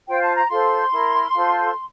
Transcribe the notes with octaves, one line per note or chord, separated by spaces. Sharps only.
F4 C5 G5
A5
A#5
F4 A4 C5 C6
E4 A#4
F4 A4 C5